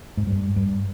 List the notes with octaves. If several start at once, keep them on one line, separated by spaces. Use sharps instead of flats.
G#2
G2
G2